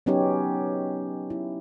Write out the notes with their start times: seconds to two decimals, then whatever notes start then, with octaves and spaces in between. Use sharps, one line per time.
0.06 F#3 B3 C#4 D#4 G4 C#5
1.30 E4